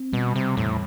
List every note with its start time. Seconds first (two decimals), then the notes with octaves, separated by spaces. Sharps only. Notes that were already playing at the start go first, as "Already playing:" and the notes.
Already playing: C4
0.12 B2 G3
0.36 C3
0.57 E2 A2